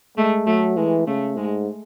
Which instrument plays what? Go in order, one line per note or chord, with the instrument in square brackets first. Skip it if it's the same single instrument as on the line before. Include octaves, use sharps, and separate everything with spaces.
[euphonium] G#3 [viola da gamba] A3
[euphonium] F#3 [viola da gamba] A3
[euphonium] E3 [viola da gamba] G#3
[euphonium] C#3 [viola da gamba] A3
[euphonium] G#2 [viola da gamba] G#3